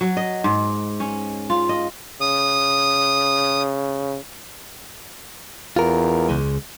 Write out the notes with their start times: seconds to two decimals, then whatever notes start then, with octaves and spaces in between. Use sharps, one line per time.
0.01 F#3
0.17 D#5
0.44 G#2
1.00 C#4
1.50 F4
1.69 D#5
2.21 C#3 D#6
5.76 E2 F4 A#4
6.29 C#2 G#3